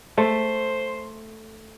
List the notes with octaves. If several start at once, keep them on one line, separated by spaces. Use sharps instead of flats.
A3 C5